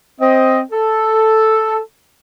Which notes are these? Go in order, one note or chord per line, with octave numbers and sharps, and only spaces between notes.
C4 D#5
A4